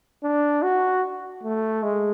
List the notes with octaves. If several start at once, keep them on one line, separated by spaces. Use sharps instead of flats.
D4
F#4
A3
G#3